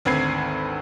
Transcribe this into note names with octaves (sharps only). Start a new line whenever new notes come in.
G#1 D2 C4 B4 G#6 C7